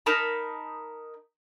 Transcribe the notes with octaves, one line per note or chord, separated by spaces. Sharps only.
D#4 A#4 A5 B5